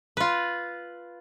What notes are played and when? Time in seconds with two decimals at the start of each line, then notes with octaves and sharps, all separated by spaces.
0.17 F4 B4